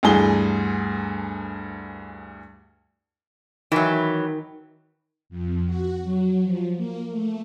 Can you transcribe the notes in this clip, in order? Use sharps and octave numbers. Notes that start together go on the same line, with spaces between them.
D2 G2 E3 G#4 G7
D#3 E3 F#3
F2
F#4
F#3
F3
A#3
A3